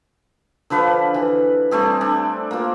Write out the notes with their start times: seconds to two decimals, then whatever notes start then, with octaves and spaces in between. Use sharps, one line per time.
0.70 D3 F3 B4 F5
1.14 E3
1.71 G3 A3 C4 G#4
2.01 D4
2.51 A#3 F4